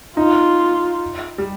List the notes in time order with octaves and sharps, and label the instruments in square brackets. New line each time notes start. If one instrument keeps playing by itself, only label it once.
[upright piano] D#4 [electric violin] F4
[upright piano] G3